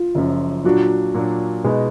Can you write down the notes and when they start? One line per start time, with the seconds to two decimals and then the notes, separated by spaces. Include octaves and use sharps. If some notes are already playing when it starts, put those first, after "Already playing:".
Already playing: F4
0.15 F#1 F#2 F3
0.64 A#2 F#3 D4 F4 F#4
1.14 A#2 F#3 D4 F#4
1.64 B2 G#3 D#4 G#4 B4